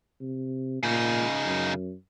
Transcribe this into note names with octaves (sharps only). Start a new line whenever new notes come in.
C3
A#2 C#3 D#4
F#2